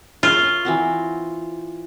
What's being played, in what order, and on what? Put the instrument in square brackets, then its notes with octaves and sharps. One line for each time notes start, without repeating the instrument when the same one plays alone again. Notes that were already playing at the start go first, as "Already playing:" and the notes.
[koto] F4 [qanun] A#4 C#5 E5
[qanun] E3 C4 F#4